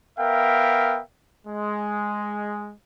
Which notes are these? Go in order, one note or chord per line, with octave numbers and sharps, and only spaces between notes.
B3 A#4 E5 F5 G5
G#3